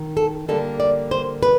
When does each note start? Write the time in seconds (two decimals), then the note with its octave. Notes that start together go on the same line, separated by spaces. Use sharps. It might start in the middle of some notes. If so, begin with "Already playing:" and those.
Already playing: D#3
0.17 A4
0.48 D3 G3 A#3 A4
0.80 D5
1.11 C5
1.43 B4